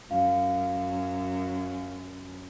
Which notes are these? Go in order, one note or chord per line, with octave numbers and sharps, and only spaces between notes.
F#2 F5